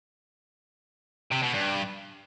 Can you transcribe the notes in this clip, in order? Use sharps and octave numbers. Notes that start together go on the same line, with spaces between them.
C3
B2
G2